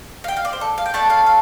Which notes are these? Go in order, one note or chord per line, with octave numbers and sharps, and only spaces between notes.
F5
G5
F5
D5
C5
A4
F5
G5
A3 D4 A4 A5
F5
F5